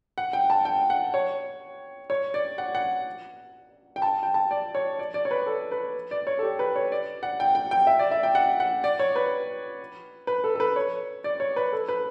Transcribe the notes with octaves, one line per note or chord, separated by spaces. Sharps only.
F#5
G5
A5
G5
F#5
C#5
C#5
D5
F#5
F#5
G5
A5
G5
A5
D5
C#5
D5
D5
C#5
B4
A4
B4
D5
C#5
A4
G4
B4
C#5
D5
F#5
G5
G5
G5
E5
D5
E5
G5
F#5
F#5
D5
C#5
B4
B4
A4
A4
B4
C#5
D5
C#5
B4
A4
B4